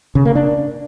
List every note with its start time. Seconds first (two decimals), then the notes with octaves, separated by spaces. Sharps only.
0.15 C#3
0.25 A#3
0.35 D4